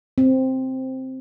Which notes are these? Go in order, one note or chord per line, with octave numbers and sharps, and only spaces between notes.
C4